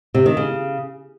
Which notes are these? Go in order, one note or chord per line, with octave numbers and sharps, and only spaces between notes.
C3
D#3
C#3